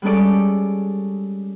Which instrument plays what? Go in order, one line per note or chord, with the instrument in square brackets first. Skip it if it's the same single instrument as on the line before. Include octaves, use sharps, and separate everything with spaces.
[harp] G3 G#3 C#4 A4 D5